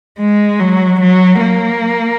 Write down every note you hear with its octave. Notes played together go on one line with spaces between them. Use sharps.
G#3
F#3
F#3
A#3